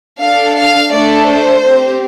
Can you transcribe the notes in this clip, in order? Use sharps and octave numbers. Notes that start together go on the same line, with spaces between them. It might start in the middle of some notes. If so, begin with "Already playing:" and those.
D4 A4 F5
F5
A3 D4 A4 D5
C5
C4 G4